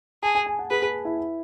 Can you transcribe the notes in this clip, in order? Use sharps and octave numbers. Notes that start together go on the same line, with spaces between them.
G#4 A5
G#5
G#5
F#5
G#4 B4
G#4
E4